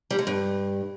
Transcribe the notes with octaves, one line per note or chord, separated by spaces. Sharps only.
G3
G#3
G2